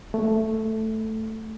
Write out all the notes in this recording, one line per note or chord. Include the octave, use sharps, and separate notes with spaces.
A3